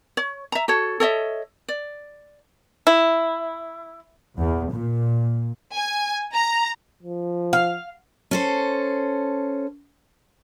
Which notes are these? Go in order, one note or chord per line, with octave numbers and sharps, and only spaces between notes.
C#5
E5 A#5
F#4 A4 C#5
A4 C#5 D#5 E5
D5
E4
E2
A#2
G#5
A#5
F3
F5
C#4 A4 C5